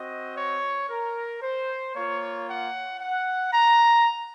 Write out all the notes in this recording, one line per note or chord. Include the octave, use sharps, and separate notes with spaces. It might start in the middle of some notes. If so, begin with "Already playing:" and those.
Already playing: C4 F#4 D#5
C#5
A#4
C5
A#3 F4 C#5
F#5
F#5
A#5